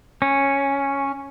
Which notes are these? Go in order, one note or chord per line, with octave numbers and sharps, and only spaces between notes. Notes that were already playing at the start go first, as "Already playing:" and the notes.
C#4